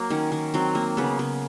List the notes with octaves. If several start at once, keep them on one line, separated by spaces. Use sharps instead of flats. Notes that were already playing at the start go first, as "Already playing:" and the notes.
Already playing: F#3 A#3
D#3 C#4
D#3
F#3 C4
A#3
C#3 B3
C#3